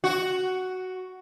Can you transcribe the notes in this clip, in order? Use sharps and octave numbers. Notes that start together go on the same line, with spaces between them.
F#4